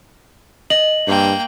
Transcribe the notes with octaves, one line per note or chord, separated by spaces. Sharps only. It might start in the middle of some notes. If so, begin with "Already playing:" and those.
D#5 F#7
G2 A#3 G5